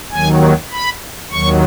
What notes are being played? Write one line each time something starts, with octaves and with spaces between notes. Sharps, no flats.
D#2 D#3 F#3 G#5
B5
D#2 D#3 F#3 C#6